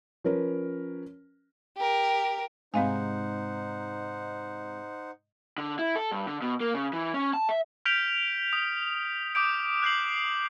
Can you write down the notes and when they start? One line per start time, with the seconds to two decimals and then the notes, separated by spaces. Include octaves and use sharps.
0.24 F3 C#4 A#4 B4
1.77 G4 A#4
2.74 G#2 C3 C4 D#4 C5 F5 F#5 G#5
5.58 D3
5.79 E4
5.96 A4
6.12 G2
6.26 D3
6.42 B2
6.60 A#3
6.74 C#3
6.93 E3
7.14 C#4
7.34 A5
7.49 E5
7.85 F6 G6 B6 D7 F7
8.53 D#6
9.35 D6 D#6 G6 D7
9.82 F#6 G6 C7 F#7